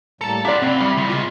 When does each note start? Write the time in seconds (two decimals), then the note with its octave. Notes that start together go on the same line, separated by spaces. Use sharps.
0.21 A2 G3 A#3 A4 A5 A#5
0.45 G#3 E4 G4 D5 F5 F#5
0.62 C3 E3 C4
0.81 C#3 G3 E4
0.97 C2 A#2 C#3
1.10 G#3 F4